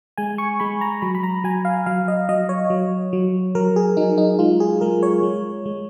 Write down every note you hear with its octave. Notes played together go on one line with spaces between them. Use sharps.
G#3 G#5
C#6
G#3 B5
A#5
F#3 B5
B5
A#5
F#3 G#5
F5
F#3 F5
D#5
F#3 D#5
C#5
F#3
F#3
F#3 A#4
G#4
F#3 D#4
D#4
G#3 F4
G#4
G#3 A#4
C#5
G#3
G#3